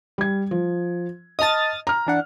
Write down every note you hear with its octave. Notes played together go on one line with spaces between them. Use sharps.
G3 G#6
F3
D#5 A5 D#6 F6 A6
A#5 F6
E3 D4 F#5